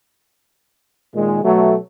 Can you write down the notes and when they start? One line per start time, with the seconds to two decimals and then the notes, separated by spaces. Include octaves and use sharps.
1.14 A#2 D#3 G#3
1.43 B2 F#3 A3